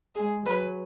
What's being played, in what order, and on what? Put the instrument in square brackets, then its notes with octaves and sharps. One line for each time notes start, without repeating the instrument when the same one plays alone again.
[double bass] G#3 [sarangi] G#4
[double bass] F#3 [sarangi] B4